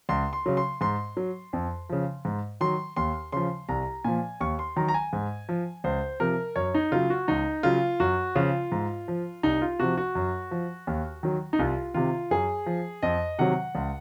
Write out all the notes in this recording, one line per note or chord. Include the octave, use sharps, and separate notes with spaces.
C#2 C6
C6
C#3 F#3
C6
G#2 C6
F#3
F2
C#3 F3
G#2
D#3 F#3 C6
D#2 C6
C#3 F3 C6
C2 A#5
A#2 F3 G#5
D#2 C#6
C6
D#3 F#3 A#5
A#5
G#5
G#2
F3
C#2 C5
C3 F3 A#4
F#2 C#5
D#4
C#3 F#3 F4
F#4
C#2 D#4
C#3 F#3 F4
F#2 F#4
C#3 F3 F4
G#2
F3
C2 D#4
F4
C3 F3 F#4
F#4
F#2
F3
D#2
D#3 F#3
D#4
C2 F4
C3 D#3 F4
F#2 G#4
F3
F2 D#5
C3 D#3 F#3 F#5
C#2